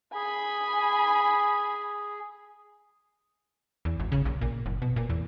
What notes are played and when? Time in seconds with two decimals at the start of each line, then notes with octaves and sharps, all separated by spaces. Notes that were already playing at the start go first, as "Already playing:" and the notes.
0.15 G#4 G#5 B5
3.85 E2
4.00 G#1
4.12 C#3
4.25 A#1
4.41 A#2
4.66 F#1
4.82 B2
4.96 A#2
5.10 E2